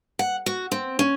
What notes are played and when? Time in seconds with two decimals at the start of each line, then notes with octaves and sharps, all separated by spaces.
0.19 F#5
0.46 F#4
0.72 C4
0.99 C#4